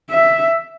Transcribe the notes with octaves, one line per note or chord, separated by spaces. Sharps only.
E5